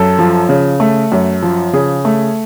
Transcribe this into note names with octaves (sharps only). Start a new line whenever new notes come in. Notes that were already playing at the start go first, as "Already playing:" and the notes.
Already playing: F#2 A4
F3
C#3
A3
F#2
F3
C#3 G#4
A3